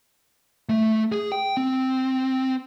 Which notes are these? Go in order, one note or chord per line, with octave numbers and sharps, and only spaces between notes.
A3
G#4
G5
C4